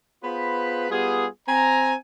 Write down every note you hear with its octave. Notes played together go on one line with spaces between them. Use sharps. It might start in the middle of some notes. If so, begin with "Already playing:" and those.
B3 F4 G#4 B4 C5 B5
G3 B3 F4 G#4
C4 G#5 A#5